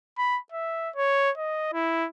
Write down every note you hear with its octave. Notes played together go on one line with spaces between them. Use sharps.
B5
E5
C#5
D#5
E4